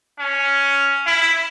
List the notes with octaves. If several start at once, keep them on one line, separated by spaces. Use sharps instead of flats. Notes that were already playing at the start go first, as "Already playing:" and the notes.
C#4
E4